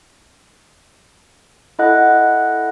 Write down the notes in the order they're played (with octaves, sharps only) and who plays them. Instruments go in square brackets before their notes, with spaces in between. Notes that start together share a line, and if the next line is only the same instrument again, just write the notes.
[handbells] E4 A4 D#5 F#5 F#6